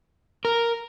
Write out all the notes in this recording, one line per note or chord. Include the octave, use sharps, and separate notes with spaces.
A#4